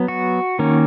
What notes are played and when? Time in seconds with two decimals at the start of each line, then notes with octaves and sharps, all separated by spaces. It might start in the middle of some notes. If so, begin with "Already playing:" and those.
Already playing: F#3 B3
0.08 F#4
0.59 D#3 A#3 C#4